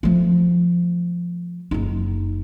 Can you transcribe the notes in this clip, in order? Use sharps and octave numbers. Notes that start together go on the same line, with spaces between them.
F3 A3
F#1 D#4